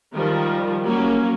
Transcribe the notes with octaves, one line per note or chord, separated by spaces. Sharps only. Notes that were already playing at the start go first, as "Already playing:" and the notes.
D#3 F3 G3
F#3 A#3 C#4